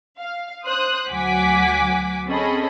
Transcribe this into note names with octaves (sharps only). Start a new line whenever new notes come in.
F5
C5 D#6 F#6
D2 F#3 F#5 G#5 D6 B6
C4 C#4 G#4 A4 D#5 B5